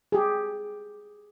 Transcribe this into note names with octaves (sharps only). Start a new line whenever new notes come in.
G4 G#4